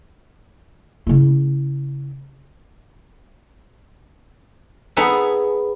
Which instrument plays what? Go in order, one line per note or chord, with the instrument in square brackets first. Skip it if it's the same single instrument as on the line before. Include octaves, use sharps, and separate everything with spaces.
[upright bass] C#3 E4
[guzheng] B3 D#4 G#4 A4 B4 G#5